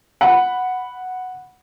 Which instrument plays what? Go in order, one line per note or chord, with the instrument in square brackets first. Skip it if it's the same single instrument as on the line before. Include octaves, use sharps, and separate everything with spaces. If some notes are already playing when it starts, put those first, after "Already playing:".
[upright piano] F#5 B5